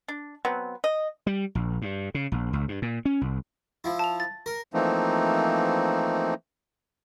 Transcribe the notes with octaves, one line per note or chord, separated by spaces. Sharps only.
D4
F#3 B3 C4
D#5
G3
A#1
G2
C#3
A#1
C#2
G2
A#2
C#4
C2
F3 E4
A5 F7
A6
A#4
E3 F3 A3 A#3 C4 D#4